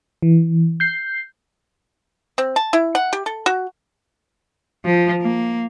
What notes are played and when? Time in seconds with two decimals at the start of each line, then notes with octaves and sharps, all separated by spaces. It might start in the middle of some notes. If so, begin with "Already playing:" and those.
0.22 E3
0.80 G6 C7
2.38 C4
2.56 A5
2.73 E4
2.95 F#5
3.13 G4
3.26 A4
3.46 F#4
4.85 F3
5.22 A#3